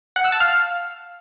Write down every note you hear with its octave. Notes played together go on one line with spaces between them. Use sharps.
F#5
E6
A5
F5